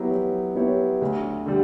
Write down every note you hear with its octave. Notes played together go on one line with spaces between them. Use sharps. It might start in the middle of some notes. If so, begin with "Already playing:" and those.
Already playing: F#3 B3 E4 G4
F#3
B3 E4 G4 C#5
D2
D3 G3